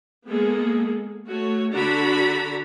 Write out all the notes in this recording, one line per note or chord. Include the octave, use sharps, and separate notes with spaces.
G#3 A#3 B3 G#4 A4
A3 F#4 C#5
D3 D4 F#4 A#5 B5